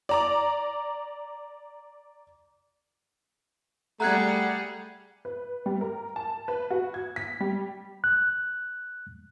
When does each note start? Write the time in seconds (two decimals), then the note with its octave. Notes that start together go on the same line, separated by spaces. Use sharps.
0.09 D5 A#5 D6
4.00 G3 A3 G#4 F#5 A#5 F#6 G#6
5.25 B4
5.66 G3
5.81 A#4
6.16 A5
6.48 B4
6.70 F#4
6.94 G#6
7.16 B6
7.40 G3
8.04 F#6